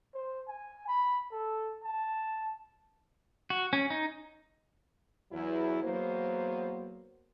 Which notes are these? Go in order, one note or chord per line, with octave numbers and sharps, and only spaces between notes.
C5
G#5
B5
A4
A5
F#4
C#4
D#4
E2 F#3 E4
E2 F#3 A#3 B3 C5